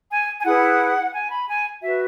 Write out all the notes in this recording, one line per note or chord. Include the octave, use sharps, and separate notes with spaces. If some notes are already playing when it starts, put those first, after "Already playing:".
G#5
G#5
E4 G#4 B4 F#5
G#5
B5
G#5
F#4 B4 E5